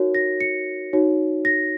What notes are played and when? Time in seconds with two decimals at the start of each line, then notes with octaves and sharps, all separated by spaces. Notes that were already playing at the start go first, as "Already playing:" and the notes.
Already playing: D#4 F#4 A#4 C#5
0.15 A#6
0.41 C#7
0.93 D#4 F#4 C#5
1.45 A#6